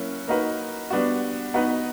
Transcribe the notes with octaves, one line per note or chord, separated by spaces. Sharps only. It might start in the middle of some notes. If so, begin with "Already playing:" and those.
Already playing: F#3 A#3 C#4 E4
A#3 D#4 F#4 B4
G3 B3 D4 F#4
B3 D#4 F#4 B4